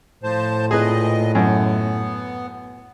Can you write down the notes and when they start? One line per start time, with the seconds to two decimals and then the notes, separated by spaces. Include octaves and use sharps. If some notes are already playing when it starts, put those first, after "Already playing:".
0.23 A2 F3 C5 A5
0.71 A#2 G#4 B4 D#5
1.35 F#2 B3